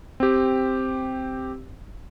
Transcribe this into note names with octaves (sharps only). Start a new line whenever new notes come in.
C4 G4